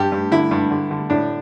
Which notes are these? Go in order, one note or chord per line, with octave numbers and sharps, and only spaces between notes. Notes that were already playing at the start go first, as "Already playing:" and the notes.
Already playing: G2 G4
G2
D3 E4
G2
D3
D3
A2 D4